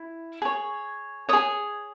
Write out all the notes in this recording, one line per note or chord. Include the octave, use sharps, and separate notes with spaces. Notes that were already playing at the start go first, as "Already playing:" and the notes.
Already playing: E4
G#4 C#5
G#4 C#5 D#6